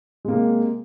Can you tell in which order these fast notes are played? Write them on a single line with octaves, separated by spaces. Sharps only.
G#3 A#3 C3